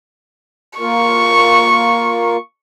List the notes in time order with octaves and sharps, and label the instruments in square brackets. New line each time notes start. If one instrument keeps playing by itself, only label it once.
[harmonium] A#3 F4 A#4 [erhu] C#6